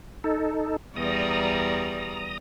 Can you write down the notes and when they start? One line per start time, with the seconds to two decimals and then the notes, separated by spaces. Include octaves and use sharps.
0.24 D#4 A4
0.96 E2 G3 D5 A#5 D#6